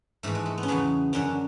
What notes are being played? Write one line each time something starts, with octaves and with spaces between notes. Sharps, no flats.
G#2 E3 A3
G#3
A3
B3
C#4
E2 C#3 F#3 B3
F#2 D3 F#3 C#4